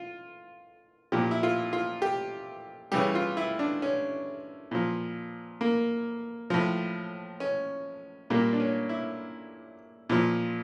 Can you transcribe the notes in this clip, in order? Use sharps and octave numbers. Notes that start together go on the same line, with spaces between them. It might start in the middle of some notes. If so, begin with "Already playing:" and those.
Already playing: F4
A#2 F3 G4
E4
F4
F4
G4
C#3 E3 G3 G4
F4
E4
D4
C#4
A#2 F3
A#3
A2 F3
C#4
A#2 G3 A#3
D4
C#4
E4
A#2 F3